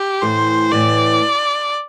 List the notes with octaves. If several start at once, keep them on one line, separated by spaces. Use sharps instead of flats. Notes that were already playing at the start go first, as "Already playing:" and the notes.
Already playing: G4
A2 E3 A3 C5
A2 E3 A3 D5